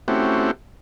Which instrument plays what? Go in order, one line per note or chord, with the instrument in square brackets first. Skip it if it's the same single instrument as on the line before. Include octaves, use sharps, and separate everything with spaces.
[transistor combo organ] A3 C4 C#4 E4 F#4 G4